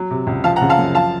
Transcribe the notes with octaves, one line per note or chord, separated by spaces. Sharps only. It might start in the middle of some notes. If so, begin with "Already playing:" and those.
Already playing: F#3
C3
C#2
F3 F5 A5
F#5 A#5
C#3
F5 A5
F#2
F3 F5 A5